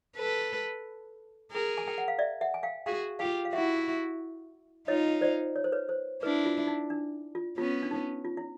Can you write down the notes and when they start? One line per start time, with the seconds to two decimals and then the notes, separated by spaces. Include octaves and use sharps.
0.17 A4 B4
1.52 G#4 A#4
1.78 G#5
1.88 G5
1.98 F#5
2.08 F5
2.19 D5 E5
2.41 E5 F#5
2.54 G#5
2.63 F5 G5
2.86 F#4 G#4 F5 G5
3.19 F4 G4 F5 G5
3.45 F5
3.53 E4 F#4 E5 F#5
4.87 D#4 F4 C#5 D#5
5.21 C5 D5
5.56 C#5
5.64 C5
5.72 B4 C#5
5.89 C5
6.22 D4 E4 B4
6.45 F4
6.67 D#4
6.90 D4
7.35 F4
7.58 B3 C#4 F4
7.83 D4
7.91 D#4
8.25 F4
8.37 E4